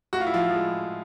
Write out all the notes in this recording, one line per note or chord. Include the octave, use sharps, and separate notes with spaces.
A2 F#4
F4
E4
F3 F4
F3 G#3